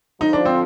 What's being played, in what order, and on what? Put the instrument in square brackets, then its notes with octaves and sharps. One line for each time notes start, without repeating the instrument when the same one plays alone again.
[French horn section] F2 D3 F3 [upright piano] D#4
[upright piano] D4
C4